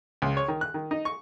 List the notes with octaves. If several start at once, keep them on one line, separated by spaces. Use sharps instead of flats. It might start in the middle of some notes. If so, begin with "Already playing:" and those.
C#2
C#5
D#3
F#6
D#3
D#4
C#6